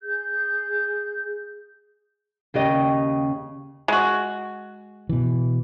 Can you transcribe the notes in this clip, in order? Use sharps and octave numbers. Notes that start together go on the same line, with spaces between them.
G#4 G6
D#2 C#3 G4 D#5
G#3 F#4
B2 E3